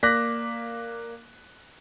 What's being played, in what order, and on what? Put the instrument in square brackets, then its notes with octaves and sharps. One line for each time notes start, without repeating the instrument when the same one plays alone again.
[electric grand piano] A#3 [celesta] D5 D6 [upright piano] F#6 A#6 B6